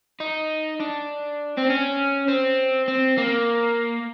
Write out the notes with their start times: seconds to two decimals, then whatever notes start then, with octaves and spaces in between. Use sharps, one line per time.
0.20 D#4
0.80 D4
1.57 C4
1.70 C#4
2.28 C4
2.88 C4
3.18 A#3